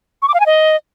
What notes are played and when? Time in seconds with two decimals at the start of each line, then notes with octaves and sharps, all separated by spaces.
0.22 C#6
0.28 D6
0.34 F5
0.40 G#5
0.46 D#5